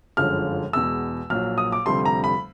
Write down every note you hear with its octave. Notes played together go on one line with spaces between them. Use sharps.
G1 F#2 D3 F3 G#3 F6
E2 B2 G#3 E6
A#1 A#2 F#3 F6
D#6
D6
F1 F2 D3 G3 C6
A#5
B5